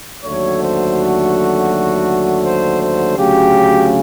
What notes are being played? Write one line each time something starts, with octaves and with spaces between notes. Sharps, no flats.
D#2 D3 F#3 A3 C#5
C5
F#4
C5
C5
D2 C#3 F#3 G4